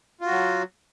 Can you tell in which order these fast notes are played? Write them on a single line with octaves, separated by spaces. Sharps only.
F4 F#4 F#3